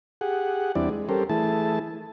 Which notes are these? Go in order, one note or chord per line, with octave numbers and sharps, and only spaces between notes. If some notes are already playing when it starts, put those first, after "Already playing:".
G4 G#4 F#5
E2 G3 C4 D4 E4 D5
G#3
G3 C#4 G4 A4 A#4 C5
E3 A3 E4 G#4 A5